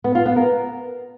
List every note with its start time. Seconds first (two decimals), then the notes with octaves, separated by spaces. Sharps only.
0.04 B3
0.15 F4
0.26 B3
0.36 A#4